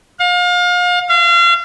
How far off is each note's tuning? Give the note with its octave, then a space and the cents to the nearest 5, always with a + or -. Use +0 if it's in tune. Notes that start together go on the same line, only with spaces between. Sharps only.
F5 +35
F5 -35